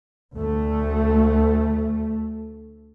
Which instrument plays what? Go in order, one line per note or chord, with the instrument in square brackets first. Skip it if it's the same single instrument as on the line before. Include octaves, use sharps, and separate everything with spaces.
[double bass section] D2 A3